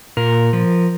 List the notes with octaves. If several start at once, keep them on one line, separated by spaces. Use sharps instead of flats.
A#2 A#4
F3